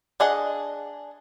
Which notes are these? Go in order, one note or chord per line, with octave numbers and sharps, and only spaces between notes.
D4 G#4 D#5 F#5